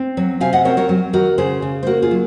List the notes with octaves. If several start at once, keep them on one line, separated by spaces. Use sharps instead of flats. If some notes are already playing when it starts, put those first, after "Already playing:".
Already playing: C4
F#3
C3 F5 G#5
D#5 F#5
C4 A#4 C#5
A#4 C#5
F#3
D#3 F#4 A#4
C#3 G#4 C5
C#3
C5
A#3 F#4 A#4
F4 G#4
F#3